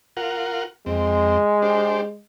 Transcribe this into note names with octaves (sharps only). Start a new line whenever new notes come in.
F4 A#4 F#5
F2 G#3 C4
D4 G4 C5